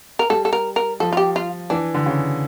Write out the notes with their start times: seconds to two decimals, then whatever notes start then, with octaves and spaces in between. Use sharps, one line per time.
0.19 A#4
0.30 G3 A4
0.45 A4
0.53 A#4
0.76 A#4
1.00 F3 A4
1.13 F4
1.17 G4
1.36 F4
1.70 E3 D4
1.94 D3
2.06 C#3